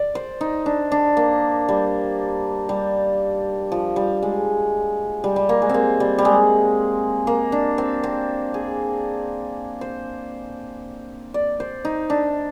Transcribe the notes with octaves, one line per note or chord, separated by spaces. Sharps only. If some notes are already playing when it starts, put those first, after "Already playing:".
Already playing: D5
C5
D#4
D4
D4
A#3
G3
G3
F3
G3
G#3
G3
G3
A#3
G#3
A#3 C4
G3
G3
G#3
A#3
D4
C4
C4
G#4
C5
D5
C5
D#4
D4